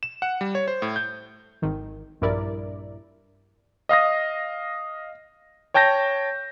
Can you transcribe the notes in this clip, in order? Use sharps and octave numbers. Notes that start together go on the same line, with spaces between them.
E7
F#5
G3
C#5
C5
A2
G6
G#1 D#3
A#1 G2 E4 A#4 D5
D#5 F5 D#6 A#6
C#5 G5 A5 G6 A#6